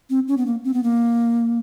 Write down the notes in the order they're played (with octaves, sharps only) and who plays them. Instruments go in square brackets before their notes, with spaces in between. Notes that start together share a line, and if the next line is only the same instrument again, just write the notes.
[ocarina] C4
C#4
B3
A#3
C4
B3
A#3